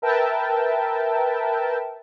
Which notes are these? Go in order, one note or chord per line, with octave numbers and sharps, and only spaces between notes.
A#4 B4 E5 G5 A5